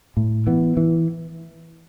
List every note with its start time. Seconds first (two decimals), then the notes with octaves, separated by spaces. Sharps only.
0.17 A2
0.47 E3 B3
0.77 E3